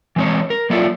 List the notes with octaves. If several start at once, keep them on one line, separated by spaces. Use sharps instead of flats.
E3 G#3 C4 C#5
A#4
F#3 A#3 E4 F4 A4 D5